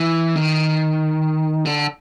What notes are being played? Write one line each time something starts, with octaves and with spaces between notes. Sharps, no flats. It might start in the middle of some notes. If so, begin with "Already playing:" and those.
Already playing: E3
D#3
D3